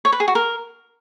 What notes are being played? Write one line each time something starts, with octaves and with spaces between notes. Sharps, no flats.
C#5
B4
G#4
F#4
A#4